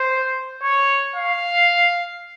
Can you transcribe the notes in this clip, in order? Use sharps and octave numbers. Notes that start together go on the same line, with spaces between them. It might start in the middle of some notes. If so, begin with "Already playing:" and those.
Already playing: C5
C#5
F5